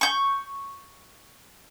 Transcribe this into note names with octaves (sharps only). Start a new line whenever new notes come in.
C#6 G6